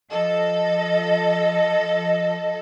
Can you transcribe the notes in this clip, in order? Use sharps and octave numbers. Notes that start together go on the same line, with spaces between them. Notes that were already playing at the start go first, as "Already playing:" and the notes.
F3 A4 D#5